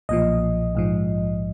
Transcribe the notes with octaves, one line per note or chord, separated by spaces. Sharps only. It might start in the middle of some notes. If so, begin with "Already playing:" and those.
B1 A#2 F3 D#5
A#1 G#2 F3